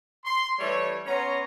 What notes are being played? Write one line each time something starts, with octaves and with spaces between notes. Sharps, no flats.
C6
E3 G3 A3 C#5
B3 C#4 C#5 A#5 C6